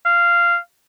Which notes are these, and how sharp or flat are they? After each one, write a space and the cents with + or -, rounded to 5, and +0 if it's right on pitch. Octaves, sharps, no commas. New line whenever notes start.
F5 -15